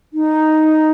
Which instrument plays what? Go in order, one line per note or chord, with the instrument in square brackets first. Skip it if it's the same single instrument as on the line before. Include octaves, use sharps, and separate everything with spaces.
[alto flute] D#4